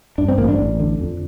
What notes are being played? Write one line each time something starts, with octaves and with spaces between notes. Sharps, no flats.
G2 D4
C4
A1 A#3
D4
A1
D3
F2